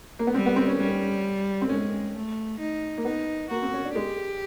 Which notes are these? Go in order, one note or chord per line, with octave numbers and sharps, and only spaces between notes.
A#3
B3
G3 C4
B3
C4
C#4
G3 C#4
C4
G#3 C#4
A3
D#4
A#3
B3 D#4
A#3 F#4
C4
C#4
D4
G#3 G4